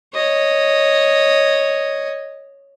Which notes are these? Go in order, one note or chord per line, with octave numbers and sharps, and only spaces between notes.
C#5 D#5